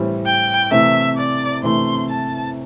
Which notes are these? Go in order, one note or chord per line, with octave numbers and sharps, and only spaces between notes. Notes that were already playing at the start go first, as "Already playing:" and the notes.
Already playing: A2 E3 G3 C4
G5
C3 E3 A3 E5
D5
C3 E3 A3 C6
A5